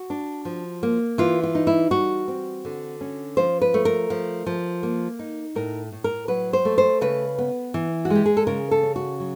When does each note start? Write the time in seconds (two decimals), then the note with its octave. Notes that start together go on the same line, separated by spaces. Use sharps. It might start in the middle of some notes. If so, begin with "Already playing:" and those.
Already playing: F#4
0.10 D4
0.45 F3
0.83 A#3
1.18 E3 F4
1.43 F4
1.55 D#4
1.67 E4
1.91 G3 F#4
2.28 C4
2.65 D3
3.01 C#4
3.37 F3 C5
3.61 B4
3.74 A3
3.85 A#4
4.10 F3
4.46 F3
4.83 A#3
5.19 D#4
5.55 A2 A#4
5.92 A2
6.04 A#4
6.28 F#3 B4
6.53 C5
6.65 A3
6.78 C5
7.01 C#3 B4
7.38 B3
7.74 E3
8.05 F#4
8.10 G#3
8.15 G4
8.26 G#4
8.37 A4
8.47 C#3 A#4
8.71 A4
8.83 C#4
8.96 F#4
9.20 F#3